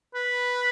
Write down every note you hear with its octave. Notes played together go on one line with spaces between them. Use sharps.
B4